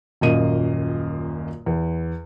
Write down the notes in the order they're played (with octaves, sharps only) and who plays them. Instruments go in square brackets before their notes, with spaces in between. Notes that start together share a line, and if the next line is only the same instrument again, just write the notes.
[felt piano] D#1 F#2 A#2 A#3 D#5 D#7
E2